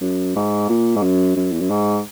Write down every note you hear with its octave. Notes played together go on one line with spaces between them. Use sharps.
F#2
G#2
A#2
G#2
F#2
F#2
E2
F#2
G#2